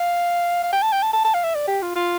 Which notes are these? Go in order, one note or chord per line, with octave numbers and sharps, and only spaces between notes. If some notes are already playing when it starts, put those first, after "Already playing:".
Already playing: F5
F5
G5
A5
G5
A5
A5
A5
F5
E5
D5
G4
F4
F4